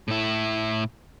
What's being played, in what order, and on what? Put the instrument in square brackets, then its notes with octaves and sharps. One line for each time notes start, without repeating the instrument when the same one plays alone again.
[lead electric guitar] A2 E4